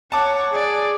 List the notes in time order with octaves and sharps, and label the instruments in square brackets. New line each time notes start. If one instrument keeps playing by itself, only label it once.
[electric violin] C#5 F#5 [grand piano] A5 D6
[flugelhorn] G#4 [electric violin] D5